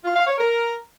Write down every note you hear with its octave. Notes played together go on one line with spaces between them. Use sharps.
F4
F5
C#5
A#4